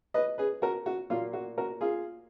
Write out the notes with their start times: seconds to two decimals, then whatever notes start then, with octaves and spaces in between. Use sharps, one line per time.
0.14 B4 D#5
0.38 G#4 B4
0.62 F#4 A#4
0.86 F#4
1.10 A#2 F#3 A#3 F4
1.33 F#4
1.58 F#4 A#4
1.81 F4 G#4